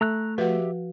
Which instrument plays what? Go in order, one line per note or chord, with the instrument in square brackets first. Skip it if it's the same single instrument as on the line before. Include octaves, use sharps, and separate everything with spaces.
[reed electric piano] A3 [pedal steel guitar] A#5 E6 F#6
[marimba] F3 F#4 [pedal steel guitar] G4 E5 [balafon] B4 F#5